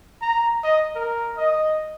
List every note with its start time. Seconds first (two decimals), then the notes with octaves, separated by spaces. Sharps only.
0.21 A#5
0.63 D#5
0.95 A#4
1.37 D#5